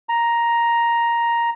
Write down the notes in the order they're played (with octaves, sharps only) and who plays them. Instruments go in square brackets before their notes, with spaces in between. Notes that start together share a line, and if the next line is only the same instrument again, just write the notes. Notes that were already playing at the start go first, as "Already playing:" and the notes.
[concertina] A#5